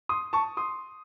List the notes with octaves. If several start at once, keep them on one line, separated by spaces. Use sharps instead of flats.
C6 D#6
A5 C#6
C6 D#6